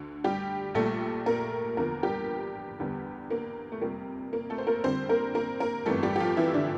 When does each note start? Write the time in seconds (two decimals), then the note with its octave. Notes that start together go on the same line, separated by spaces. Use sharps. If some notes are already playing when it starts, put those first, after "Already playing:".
Already playing: D2 D3
0.24 G3 G4
0.74 A#1 A#2 G3 A3 A4
1.26 A#3 A#4
1.77 E2 D3 F3 A#3 A#4
2.03 G3 G4
2.80 E2 D3 G3
3.31 A#3
3.72 A3
3.81 F2 C3 G3 A#3
4.33 A#3
4.50 A3 A4
4.58 C5
4.67 A#3 A#4
4.84 F2 D3 G3 C4 C5
5.09 A#3 A#4
5.35 A#3 A#4
5.60 A#3 A#4
5.86 G1 F2 E3 G3 A3 A4
6.03 G3 G4
6.16 G4
6.20 F3 F4
6.37 E3 E4
6.54 D3 D4